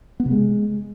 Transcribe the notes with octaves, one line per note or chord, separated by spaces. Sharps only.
B3
C3
G#3